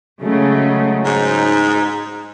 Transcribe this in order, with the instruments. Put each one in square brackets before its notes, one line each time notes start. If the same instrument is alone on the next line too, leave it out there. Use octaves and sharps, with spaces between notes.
[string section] C#3 A3 [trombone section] F#3 G#3
[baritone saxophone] G#2 [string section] D#4